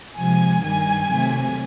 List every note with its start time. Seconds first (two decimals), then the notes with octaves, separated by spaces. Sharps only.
0.16 C3 F3 G#3 G#5
0.63 G2 D#3 G3 G#5
1.10 C3 D#3 F#3 A3